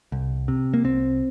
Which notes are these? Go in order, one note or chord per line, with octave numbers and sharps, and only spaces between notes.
C2
C3
A#3
C2 C4